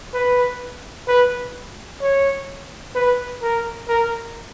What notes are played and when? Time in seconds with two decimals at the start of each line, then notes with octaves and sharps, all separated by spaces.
0.14 B4
1.08 B4
2.01 C#5
2.95 B4
3.42 A#4
3.89 A#4